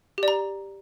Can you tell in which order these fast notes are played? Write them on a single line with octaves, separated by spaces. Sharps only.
G4 D5 A#5